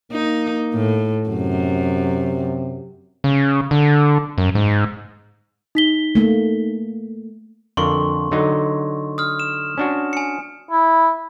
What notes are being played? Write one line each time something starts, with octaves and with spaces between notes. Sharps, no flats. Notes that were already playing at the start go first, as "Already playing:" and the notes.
A#3 D#4
A2
F#2 C3
C#3
D3
F#2
G#2
D#4 B6 G7
A3 A#3
F2 D3 A#4 C6 C#6
D3 F#3 D#4
D#6 F6
E7
C#4 D4 F#4
G#5 C#7
E4